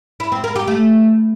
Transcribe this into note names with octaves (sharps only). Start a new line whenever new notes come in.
E4
C4
A#4
G4
A3